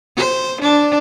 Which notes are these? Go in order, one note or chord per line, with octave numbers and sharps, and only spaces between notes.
C5
D4